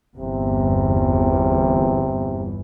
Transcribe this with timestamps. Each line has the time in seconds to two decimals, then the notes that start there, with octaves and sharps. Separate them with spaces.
0.17 G1 E2 C3